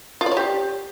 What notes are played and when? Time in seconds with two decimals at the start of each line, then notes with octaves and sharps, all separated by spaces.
0.21 F4
0.26 D5
0.31 C#5
0.37 G4